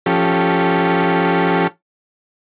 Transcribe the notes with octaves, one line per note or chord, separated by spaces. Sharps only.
F3 C#4 G4 A4